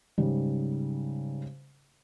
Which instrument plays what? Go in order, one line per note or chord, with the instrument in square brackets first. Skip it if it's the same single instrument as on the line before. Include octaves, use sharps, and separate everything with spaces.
[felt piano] G#2 C#3 G3